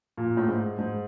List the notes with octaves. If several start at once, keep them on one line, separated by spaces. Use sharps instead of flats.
A#2
A2
G#2
G#2